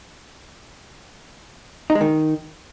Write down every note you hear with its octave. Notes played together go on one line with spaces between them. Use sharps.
D#4
G#3
D#3